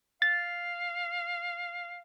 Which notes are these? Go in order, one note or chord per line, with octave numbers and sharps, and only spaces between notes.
F5 A6